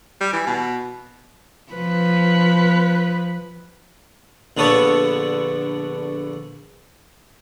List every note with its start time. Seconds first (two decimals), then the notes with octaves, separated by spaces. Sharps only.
0.21 G3
0.33 E3
0.47 B2
1.73 F3 B4
4.57 A#1 D3 B3 A4 C#5